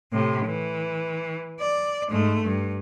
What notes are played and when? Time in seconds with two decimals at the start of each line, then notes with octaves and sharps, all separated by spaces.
0.12 A2 C3
0.46 E3
1.61 D5
2.11 G#2 A3
2.45 G2